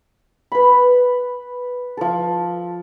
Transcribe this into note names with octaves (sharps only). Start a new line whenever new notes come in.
B4 B5
F3 A4